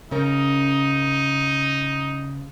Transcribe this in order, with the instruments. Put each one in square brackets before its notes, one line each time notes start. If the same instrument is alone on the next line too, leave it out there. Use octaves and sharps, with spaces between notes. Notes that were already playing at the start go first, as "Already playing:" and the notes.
[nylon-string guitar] C#3 C#4 A#4 [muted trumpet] D#4